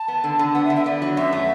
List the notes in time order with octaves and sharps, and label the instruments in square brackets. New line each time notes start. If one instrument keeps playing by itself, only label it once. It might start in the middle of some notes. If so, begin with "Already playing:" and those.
Already playing: [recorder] A5
[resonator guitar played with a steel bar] B3
D3
D3
[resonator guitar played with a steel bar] B3 [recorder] F#5
[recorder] E5
[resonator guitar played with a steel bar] D3
[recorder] E5
[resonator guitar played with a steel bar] B3 [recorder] D5
[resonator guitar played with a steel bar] F#3
[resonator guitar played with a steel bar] F#2 [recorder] E5
[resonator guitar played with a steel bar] A3